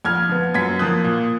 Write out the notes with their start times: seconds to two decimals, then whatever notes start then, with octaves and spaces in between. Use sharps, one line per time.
0.05 F2 F6 G#6
0.29 F3 B3
0.54 F#2 G#6 B6
0.79 F3 A#3 D#6 F#6
1.04 A#2